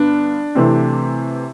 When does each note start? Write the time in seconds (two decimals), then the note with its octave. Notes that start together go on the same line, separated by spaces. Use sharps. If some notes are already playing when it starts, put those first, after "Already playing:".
Already playing: G2 D3 B3 D4
0.55 C3 E3 A3 C4